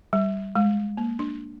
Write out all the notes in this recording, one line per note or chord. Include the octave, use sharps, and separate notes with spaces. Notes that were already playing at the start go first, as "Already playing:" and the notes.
G3
G#3
A#3
D4